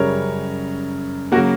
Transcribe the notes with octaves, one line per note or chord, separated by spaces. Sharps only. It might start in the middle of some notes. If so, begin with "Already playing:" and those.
Already playing: F#2 C#3 G3 A#4 C#5
C#3 F#3 A#3 F#4 A#4